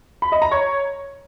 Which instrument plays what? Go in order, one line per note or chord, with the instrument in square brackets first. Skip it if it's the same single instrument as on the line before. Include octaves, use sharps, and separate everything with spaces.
[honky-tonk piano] B5
D#5
A#5
C#5